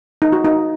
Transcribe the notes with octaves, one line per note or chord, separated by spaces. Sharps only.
D#4
F#4
D#4